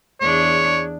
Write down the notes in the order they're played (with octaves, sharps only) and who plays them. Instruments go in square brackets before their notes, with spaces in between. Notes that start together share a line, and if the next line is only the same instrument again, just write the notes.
[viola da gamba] E2 D4 G#4 [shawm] C#5